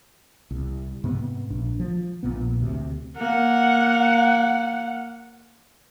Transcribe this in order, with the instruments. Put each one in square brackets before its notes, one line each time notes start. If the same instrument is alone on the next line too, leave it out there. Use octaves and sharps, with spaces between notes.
[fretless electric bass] C2
G#2 C3 B3
A#1 D4
F3
A#1 A#2 B3
D2 C3
[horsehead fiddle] A#3 F#5